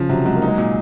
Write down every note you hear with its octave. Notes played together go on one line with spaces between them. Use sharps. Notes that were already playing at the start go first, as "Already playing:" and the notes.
Already playing: C#3 F3
C3 F#3
F#3 G#3
A#3
D#4
G#3
A#2